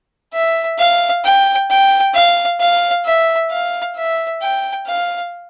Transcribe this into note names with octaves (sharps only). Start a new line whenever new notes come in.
E5
F5
G5
G5
F5
F5
E5
F5
E5
G5
F5